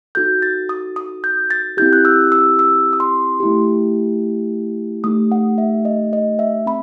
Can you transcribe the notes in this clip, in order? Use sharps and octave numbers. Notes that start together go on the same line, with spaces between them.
D#4 F#4 A4 G6
A6
D#6
D#6
G6
A6
C4 E4 G4 G6
F#6
E6
E6
E6
D#6
C6
A3 E4 G4
A3 D#4 G4 D#6
F#5
E5
D#5
D#5
E5
C4 B5